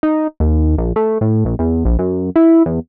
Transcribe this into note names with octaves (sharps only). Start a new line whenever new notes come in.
D#4
D#2
A#1
A3
A2
A#1
E2
A#1
F#2
E4
E2